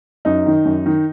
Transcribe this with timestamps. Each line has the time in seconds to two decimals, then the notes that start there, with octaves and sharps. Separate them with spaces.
0.25 F#2 D#4
0.46 D#3
0.65 F#2
0.86 D#3